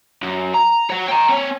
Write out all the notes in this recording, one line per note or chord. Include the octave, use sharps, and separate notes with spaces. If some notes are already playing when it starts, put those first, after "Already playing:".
F#2
A#5
C#5 F#5
G5 A#5
C4 C#5